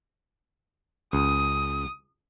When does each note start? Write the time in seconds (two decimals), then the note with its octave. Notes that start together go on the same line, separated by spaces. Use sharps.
1.13 C#2 D#6